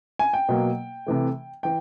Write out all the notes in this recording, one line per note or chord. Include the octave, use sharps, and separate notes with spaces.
G#5
G5
B2 F#3 A#3
C3 E3 A3
E3 G5